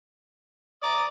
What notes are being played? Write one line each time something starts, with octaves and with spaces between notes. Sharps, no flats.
D5 A#5 D6 D#6